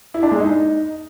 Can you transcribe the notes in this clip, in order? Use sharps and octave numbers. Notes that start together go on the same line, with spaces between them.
E4
D4
G#3
D#4